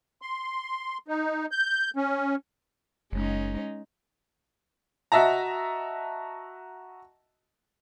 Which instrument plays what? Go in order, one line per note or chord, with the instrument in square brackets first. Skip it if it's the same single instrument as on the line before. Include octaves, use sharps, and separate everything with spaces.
[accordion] C6
D#4
G6
C#4
[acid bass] F#1 [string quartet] G#3 C#4 D#4
[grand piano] F#4 D#5 E5 A5 A#5